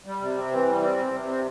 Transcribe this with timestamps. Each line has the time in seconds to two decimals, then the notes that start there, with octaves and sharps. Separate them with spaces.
0.06 G3
0.21 C3
0.37 C4
0.52 E3
0.68 G3
0.82 C4
0.98 C3
1.13 C3
1.29 C4